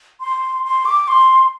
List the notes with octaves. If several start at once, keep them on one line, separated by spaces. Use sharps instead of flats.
C6
C6
D6
C6